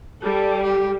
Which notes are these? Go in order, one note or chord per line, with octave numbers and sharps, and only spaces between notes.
G3 A4
G4